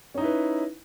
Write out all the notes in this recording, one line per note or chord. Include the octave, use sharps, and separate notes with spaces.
C#4 D#4 E4 B4